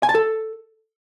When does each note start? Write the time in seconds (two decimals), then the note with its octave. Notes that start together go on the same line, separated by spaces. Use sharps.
0.03 G#5
0.09 A5
0.15 A4